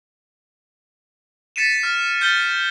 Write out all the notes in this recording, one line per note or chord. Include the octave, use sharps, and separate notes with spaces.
A6 B6 C#7 D#7 E7
F6
F6 G6 A6 C#7 G7